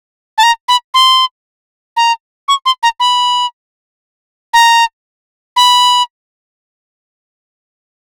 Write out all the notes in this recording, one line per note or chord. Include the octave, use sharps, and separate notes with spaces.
A5
A#5
B5
C6
A#5
C#6
C6
A#5
B5
A#5
B5